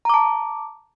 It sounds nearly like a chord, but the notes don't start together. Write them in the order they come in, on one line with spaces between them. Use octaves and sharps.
A#5 D6 A5